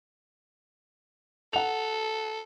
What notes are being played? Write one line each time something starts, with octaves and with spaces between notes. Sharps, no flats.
A4 F#5 F7